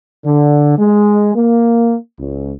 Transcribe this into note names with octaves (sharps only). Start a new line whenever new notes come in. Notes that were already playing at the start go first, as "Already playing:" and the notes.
D3
G#3
A#3
C#2